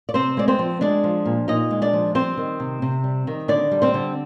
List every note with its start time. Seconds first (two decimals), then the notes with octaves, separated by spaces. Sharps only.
0.09 D5
0.14 C3 C4 C5
0.37 G#3 D5
0.48 C4 C5
0.59 F3
0.81 G#3 D4 D5
1.04 F3
1.25 A#2
1.48 A#2 D#4 D#5
1.71 G#3
1.82 D4 D5
1.93 F3
2.15 G3 C4 C5
2.37 D#3
2.60 C3
2.82 C3
3.04 G3
3.27 D#3
3.48 D3 D4 D5
3.71 G3
3.82 C4 C5
3.94 D3